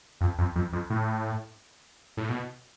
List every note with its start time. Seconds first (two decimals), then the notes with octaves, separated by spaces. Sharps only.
0.21 F2
0.38 F2
0.55 F2
0.73 F2
0.90 A2
2.17 A2
2.29 B2